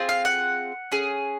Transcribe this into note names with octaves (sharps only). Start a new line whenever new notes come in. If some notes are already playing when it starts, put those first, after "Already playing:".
Already playing: C4 F4 G#4
F5
F#5
C#4 G#4